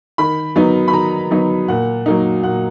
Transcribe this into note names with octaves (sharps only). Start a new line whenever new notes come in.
D#3 B5
F#3 B3 D#4
B5
D#3 A#5
F#3 B3 D#4
A#2 F#5
F#3 A#3 D#4
A#2 F#5